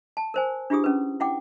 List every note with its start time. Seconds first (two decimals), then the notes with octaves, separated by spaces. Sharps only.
0.17 A5
0.34 A#4 C5 G#5
0.70 D4 E4 F4 G4 G#4 D#6
0.84 C#4 B4
1.20 E4 F#5 G5 D6